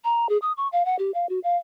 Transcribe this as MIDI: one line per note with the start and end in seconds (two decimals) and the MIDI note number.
0.04 0.29 82
0.29 0.38 68
0.42 0.52 87
0.57 0.68 85
0.72 0.85 77
0.85 0.96 78
0.99 1.11 67
1.14 1.28 77
1.29 1.39 66
1.44 1.57 77